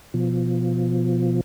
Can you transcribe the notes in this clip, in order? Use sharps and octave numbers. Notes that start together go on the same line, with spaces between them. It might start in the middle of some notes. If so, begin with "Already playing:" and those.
B2 F3